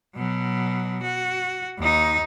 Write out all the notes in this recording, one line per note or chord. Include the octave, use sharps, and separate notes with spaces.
B2 F#3
F#4
D#2 D#4